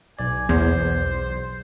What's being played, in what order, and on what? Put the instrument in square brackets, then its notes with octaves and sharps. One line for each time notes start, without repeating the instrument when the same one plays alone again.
[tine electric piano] B1 D5 [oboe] G#5
[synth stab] E2 [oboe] C5